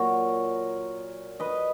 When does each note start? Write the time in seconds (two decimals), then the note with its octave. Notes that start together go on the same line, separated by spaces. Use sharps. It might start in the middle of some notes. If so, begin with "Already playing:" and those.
Already playing: A#2 F#3 A#4 C#5
1.40 B4 D#5